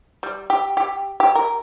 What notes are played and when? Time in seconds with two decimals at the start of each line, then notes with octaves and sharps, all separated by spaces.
0.23 G3
0.50 G4
0.77 G4
1.20 G4
1.35 A#4